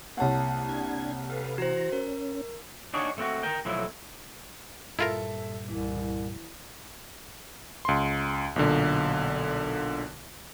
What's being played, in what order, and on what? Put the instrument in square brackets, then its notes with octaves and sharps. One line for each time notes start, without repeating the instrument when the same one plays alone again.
[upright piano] C2 C#5 F#5 [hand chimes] A#3 A5
[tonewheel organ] D4 G#6
A4 B4 F5
[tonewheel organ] E3 A#5 [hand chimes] F#4 C5
[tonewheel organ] C#4 [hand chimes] A#4
[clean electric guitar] D4 D#4 F#4 G#4 C#5 D5
A3 C4 F4 F#4
A#4 G5
B1 F3 F#3 A3 E4
[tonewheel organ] G2 A#2 G3 [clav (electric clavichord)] E4 F4 A#4 [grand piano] A4 E5
[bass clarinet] C2 [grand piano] E3
[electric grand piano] C#2 C6
B1 A#2 D3